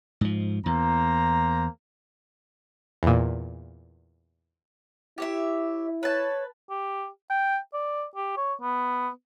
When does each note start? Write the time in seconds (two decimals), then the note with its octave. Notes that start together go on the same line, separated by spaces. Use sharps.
0.21 G#2 F3
0.66 E2 A#3 C5 A#5
3.03 E2 A#2
5.18 E4 G4 C#5 E5
6.03 B4 C#5 A5
6.70 G4
7.30 G5
7.74 D5
8.16 G4
8.37 C#5
8.62 B3